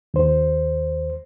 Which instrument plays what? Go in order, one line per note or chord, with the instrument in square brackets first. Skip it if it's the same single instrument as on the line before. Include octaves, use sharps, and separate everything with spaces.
[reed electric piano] D#2 C5